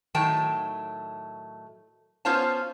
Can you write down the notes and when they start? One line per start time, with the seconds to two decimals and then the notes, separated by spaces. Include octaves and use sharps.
0.15 A2 D#3 F#3 A3 G5 A5
2.25 B3 C#4 F4 C5 F5 A5